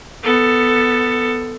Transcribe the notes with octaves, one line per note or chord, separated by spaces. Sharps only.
B3 A4